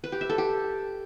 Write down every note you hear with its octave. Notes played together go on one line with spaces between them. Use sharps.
B4
G4
E5
A4
G4